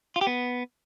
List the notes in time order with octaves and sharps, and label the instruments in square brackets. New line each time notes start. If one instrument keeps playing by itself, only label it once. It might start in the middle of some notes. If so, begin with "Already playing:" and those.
[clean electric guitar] F4
G4
B3